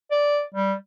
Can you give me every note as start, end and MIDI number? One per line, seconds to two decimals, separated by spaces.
0.11 0.43 74
0.55 0.74 55